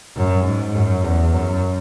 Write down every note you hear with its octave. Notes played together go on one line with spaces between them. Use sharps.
F#2
G#2
F#2
E2
F#2